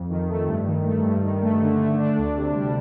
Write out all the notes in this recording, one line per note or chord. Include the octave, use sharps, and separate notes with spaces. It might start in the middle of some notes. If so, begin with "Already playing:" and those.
Already playing: F2
D#3
A3
G2
D#3
A3
G2
D#3
A3
D3
A3
D4
D2
C3
G3